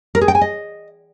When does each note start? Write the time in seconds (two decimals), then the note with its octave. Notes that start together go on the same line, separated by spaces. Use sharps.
0.15 A#4
0.21 G#4
0.28 G5
0.35 G#5
0.41 D#5